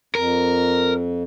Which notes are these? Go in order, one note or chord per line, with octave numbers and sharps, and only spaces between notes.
F2 A#4